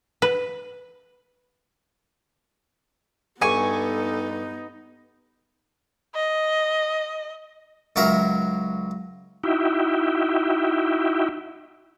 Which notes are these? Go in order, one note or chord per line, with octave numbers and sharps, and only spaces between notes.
B4
G2 B3 D#4 A4 G#5 C#6
D#5
C#2 F#3 A#4 E5 F5
D#4 E4 F#4 E5 G5